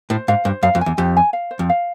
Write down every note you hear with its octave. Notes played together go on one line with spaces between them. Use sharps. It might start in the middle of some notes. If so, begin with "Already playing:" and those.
A2 C5
G#2 F5
G2 C5
F#2 F5
F2
G#5
E2
F2 G4
G#5
F5
C5
F2
F5